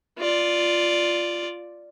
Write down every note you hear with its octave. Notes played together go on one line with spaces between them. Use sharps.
F4 D5